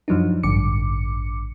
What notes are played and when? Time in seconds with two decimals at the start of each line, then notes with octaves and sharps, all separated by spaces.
0.08 F#2 F3 F#3 D4 D#4
0.43 A1 G2 D3 D6 C#7